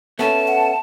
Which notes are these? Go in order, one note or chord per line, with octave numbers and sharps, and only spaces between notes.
A3 B3 C#4 A5
F#5